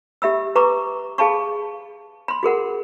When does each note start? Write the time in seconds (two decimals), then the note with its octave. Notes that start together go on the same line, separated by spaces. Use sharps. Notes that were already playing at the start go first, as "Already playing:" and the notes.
0.22 G4 E5 B5 E6
0.56 B4 A#5 C#6 D6
1.18 G#4 F5 A5 B5 C#6
2.28 B5 C6
2.43 F#4 G#4 A#4 F#5